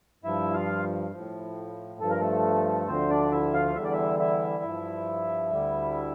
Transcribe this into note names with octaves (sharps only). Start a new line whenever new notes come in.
G2 F3 E4 E5
F4 F5
F3
A2
G2 F3 A4
A#4
A3 A4
D2 D3 F3 C4 C5
D4 D5
E4 E5
F4 F5
E2 D3 G3 E5
D5
E4 E5
E4 E5
G2 F3
D2 D3 G3